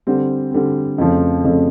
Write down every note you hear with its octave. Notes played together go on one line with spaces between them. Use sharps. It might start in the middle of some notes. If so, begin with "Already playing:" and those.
D3 G3 C4
D3 G3 C4
F2 C#3 F3 A3
F2 C#3 F3 A3